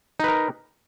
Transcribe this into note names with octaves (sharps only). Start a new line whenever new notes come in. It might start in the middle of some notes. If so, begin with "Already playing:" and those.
D#4 A#4 B4